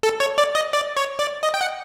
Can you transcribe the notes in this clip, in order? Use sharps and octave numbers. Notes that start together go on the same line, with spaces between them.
A4
C#5
D5
D#5
D5
C#5
D5
D#5
G5
F#5